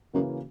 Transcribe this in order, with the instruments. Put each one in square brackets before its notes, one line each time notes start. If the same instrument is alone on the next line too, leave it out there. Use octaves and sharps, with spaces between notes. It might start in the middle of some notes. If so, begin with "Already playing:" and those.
[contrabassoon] F#2 [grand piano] C#3 E3 A#3 C#4 F#4